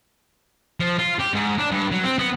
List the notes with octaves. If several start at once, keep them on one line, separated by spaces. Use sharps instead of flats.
F3
F4
G4
G#2
D4
G2
F#3
C4
B3